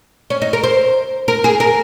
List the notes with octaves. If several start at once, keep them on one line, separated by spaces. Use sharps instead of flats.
C#4
D#4
A#4
C5
A#4
G#4
A#4